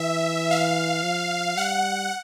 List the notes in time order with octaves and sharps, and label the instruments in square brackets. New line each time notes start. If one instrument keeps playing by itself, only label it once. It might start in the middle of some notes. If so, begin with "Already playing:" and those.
Already playing: [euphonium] E3 [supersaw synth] E5
[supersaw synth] F5
[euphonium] F3
[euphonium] G3 [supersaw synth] F#5